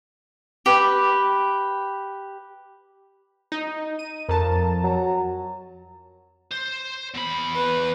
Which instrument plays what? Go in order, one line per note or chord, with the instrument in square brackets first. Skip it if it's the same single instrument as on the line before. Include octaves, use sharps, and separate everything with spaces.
[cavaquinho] G4 B4
[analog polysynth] D#4
D#7
[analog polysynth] F2 A5 [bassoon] A#4
[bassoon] F#3
[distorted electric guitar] C5
E2 B5
[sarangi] B4